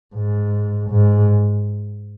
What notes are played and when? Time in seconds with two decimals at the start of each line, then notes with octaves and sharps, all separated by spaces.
0.15 G#2
0.90 G#2